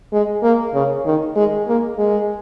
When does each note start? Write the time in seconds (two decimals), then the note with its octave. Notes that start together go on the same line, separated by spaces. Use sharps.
0.13 G#3
0.43 A#3
0.74 C#3
1.05 D#3
1.36 G#3
1.68 A#3
1.98 G#3